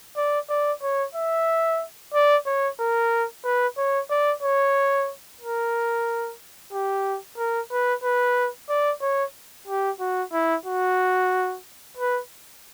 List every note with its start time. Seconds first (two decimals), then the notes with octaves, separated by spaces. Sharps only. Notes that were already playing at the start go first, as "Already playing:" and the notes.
0.17 D5
0.49 D5
0.82 C#5
1.15 E5
2.14 D5
2.46 C#5
2.80 A#4
3.44 B4
3.78 C#5
4.10 D5
4.43 C#5
5.41 A#4
6.73 G4
7.38 A#4
7.71 B4
8.04 B4
8.69 D5
9.01 C#5
9.68 G4
10.00 F#4
10.32 E4
10.66 F#4
11.97 B4